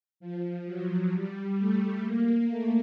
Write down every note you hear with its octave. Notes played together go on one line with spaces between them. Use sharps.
F3
F#3
G3
A3
A#3
A3